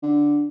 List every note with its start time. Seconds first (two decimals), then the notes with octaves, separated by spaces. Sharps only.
0.03 D3